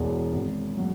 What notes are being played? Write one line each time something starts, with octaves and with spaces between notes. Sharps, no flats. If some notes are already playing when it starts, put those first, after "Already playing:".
Already playing: E1 E2 B2
G#1
F#3